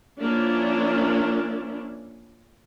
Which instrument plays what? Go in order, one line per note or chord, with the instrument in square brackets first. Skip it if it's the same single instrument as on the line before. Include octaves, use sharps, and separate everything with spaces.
[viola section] F3 A#3 C#4 D4 E4